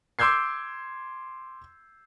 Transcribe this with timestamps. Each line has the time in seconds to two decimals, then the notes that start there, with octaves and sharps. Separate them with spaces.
0.19 C6 D6 E6 G6 G#6 C7